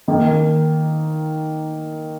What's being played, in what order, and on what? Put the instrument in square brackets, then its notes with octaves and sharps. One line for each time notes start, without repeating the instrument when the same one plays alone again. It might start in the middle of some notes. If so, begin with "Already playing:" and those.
[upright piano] D#3 A#3 D#4